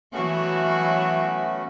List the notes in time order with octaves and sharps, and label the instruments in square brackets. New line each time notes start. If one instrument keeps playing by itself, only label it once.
[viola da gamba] E3 F#3 F#4 [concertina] A3 B3 C#4